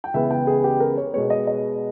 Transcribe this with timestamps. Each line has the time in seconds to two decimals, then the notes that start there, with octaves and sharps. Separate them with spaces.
0.04 G5
0.14 C#2 C#3 E3 G#3 B3 E5
0.31 G5
0.47 G#4
0.64 G4
0.80 A#4
0.97 C#5
1.13 B2 G#3 B3 C#5
1.30 D#5
1.47 D#5